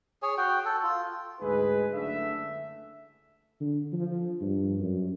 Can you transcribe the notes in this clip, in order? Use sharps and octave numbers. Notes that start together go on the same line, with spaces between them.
G#4 C#5 G#5
F#4 G5
A4
F4
D2 G#2 G#3 D#4 G#4 B4
F#1 D3 A3 E5
D3
F3
G2
F#2